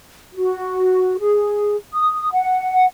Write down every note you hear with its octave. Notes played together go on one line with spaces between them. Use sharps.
F#4
G#4
D#6
F#5